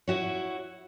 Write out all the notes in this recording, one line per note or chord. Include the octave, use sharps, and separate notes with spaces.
E4 F#4 C#5